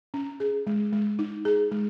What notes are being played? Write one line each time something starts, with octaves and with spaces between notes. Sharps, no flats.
C#4
G#4
G#3
G#3
D#4
G#4
G#3